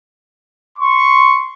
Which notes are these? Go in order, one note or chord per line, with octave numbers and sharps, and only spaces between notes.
C6 C#6